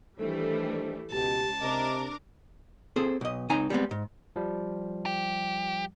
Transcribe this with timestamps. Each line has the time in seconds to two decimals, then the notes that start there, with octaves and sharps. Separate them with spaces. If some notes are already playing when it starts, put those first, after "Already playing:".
0.19 D#3 E3 G3 A3 D4 A4 C5
1.12 C#2 B2 G4 A5
1.61 C3 D4 A#4 D#5 D6
2.96 C4 G#4 A4 C5
3.21 B1 D#5
3.50 C#2 C4 D#4 G#5 A#5
3.70 G3 G#3 B3 C4
3.91 G#2
4.36 F3 G3
5.06 G4